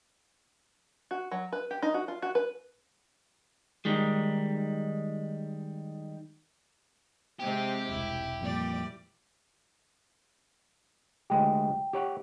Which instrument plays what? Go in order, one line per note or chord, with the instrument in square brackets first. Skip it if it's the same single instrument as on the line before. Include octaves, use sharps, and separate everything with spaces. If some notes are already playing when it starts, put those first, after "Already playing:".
[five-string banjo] F#4
F#3
B4
G4
D#4
F#4
F4
F#4
B4
[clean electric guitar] D#3 G3 G#3
[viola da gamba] C3 G#3 C4 [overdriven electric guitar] G4
[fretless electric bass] E1 C2 [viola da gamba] E4
[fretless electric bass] F2 A#2 [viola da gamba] E3 G3 D5
[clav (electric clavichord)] D2 G#3 G4 [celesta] G5
[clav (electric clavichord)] G4 C#5 F#5